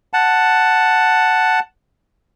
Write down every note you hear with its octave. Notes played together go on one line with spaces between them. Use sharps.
F#5 A5